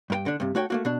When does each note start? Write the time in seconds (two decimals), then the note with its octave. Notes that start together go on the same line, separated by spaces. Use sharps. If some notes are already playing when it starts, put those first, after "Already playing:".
0.10 G2 A#4 G5
0.26 D3 D4
0.40 G2 C3
0.55 A3 F#4 C#5 G5
0.70 A3 A#3 F#4
0.85 B2 D4